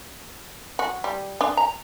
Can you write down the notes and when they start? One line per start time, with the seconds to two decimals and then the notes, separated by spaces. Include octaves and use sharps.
0.79 F#4
1.04 G3
1.41 D4
1.57 A#5